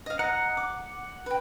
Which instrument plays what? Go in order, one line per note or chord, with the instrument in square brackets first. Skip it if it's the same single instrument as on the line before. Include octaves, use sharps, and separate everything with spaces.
[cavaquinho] D#5 F5
[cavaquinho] D#5 A#5 [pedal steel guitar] F#5
[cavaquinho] D6
B4 G5